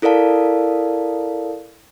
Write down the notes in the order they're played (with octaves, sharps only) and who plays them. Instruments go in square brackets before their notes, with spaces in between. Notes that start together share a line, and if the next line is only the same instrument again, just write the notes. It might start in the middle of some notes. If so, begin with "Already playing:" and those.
[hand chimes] E4 A4 A#4 D5 F5 A5